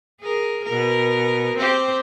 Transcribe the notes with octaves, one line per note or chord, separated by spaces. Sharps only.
G#4 A#4
B2 A#4
C4 G4 C5